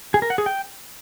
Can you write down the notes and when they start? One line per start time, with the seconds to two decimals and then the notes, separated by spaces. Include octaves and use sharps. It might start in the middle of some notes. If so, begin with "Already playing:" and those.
0.14 G#4
0.22 A#4
0.30 F#5
0.38 G#4
0.46 G5